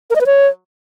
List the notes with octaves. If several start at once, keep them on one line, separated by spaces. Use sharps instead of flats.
A#4
D#5
B4
C#5